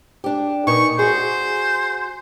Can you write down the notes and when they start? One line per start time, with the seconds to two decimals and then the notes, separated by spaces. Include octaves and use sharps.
0.24 D4 G4
0.67 A#2 B3 D#4 C#6
0.99 F#4 G#4 C5